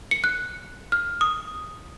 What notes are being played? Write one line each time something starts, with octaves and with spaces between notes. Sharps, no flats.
C#7
F#6
F6
D#6